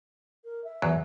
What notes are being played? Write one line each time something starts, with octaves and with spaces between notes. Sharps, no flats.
A#4
E5
E2 F#3